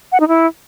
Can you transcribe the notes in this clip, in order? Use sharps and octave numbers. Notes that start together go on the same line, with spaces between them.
F#5
D#4
E4